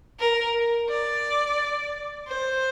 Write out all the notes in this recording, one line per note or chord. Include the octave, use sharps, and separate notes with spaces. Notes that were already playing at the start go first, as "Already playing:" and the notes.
A#4
D5
C5